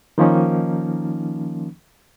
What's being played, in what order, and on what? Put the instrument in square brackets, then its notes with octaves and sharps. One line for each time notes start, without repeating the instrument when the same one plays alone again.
[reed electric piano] D#3 F3 A#3 C#4 D#4